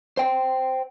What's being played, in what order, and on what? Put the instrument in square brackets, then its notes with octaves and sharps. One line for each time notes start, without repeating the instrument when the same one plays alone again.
[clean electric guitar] C5 G5